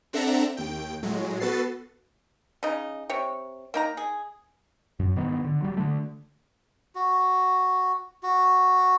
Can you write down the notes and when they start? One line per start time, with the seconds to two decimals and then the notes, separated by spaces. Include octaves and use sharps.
0.13 C4 D4 A4 E5 F#5 A#5
0.57 D#2 G5
1.03 A2 F#3 G#3
1.40 B3 F#4 A4 B4 A6 C7
2.63 C#3 D#4
3.09 C3 C#5
3.74 A#3 D#4 A#5
3.97 G#4
4.99 F#2
5.16 G#2 D#3 B3
5.44 D3
5.62 F#3 G3
5.77 D3 A3
6.95 F#4
8.23 F#4